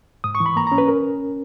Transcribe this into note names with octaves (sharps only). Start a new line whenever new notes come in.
G#2 D#6
C#6
E3
B5
A#3 A#5
A#5
C#4
B4
A#4